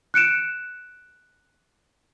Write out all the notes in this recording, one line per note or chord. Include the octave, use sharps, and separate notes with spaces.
F#6 C#7 D7 E7